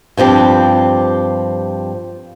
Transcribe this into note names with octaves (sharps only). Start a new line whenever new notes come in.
G2 F3 C4 G4